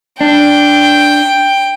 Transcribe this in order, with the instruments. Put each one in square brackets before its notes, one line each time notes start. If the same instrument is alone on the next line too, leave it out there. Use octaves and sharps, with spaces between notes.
[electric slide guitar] D4 [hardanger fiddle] G5